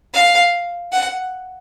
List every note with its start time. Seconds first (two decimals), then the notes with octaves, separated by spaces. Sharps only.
0.14 F5
0.92 F#5